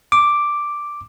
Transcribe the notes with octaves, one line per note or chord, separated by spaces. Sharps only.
D6